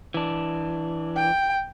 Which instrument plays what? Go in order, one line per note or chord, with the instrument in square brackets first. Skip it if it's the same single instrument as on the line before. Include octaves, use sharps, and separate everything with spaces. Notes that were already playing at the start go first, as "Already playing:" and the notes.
[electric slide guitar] E3 D4
[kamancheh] G5